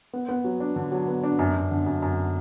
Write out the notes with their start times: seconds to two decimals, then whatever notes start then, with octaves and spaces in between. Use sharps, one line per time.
0.13 B3
0.29 B3
0.44 F#3
0.60 D4
0.76 D3
0.92 F#3
1.08 B3
1.23 D4
1.39 F#2
1.55 F#2
1.71 D3
1.86 F#2
2.02 F#2